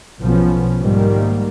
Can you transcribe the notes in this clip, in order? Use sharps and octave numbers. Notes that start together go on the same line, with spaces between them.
B1 F3 B3 C#4
G#2 D#3 G3 A#3